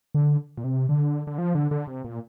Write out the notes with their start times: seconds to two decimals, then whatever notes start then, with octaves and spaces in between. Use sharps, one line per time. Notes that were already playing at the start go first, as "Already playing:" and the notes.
0.15 D3
0.58 A#2
0.64 C3
0.89 D3
1.27 D3
1.38 F3
1.55 D3
1.71 D3
1.87 C3
2.04 A#2